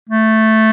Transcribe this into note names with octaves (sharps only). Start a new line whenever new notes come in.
A3